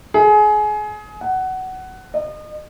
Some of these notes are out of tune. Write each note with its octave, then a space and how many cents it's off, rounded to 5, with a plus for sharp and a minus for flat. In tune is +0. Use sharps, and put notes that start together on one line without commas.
G#4 +25
F#5 +15
D#5 -35